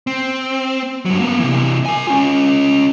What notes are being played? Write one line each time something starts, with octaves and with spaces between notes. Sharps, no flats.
C4
G2 F#3
A#3 B3
C3 E3
A#4 G#5
C#4 F4